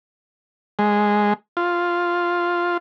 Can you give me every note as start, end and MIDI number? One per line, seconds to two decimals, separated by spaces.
0.79 1.33 56
1.57 2.77 65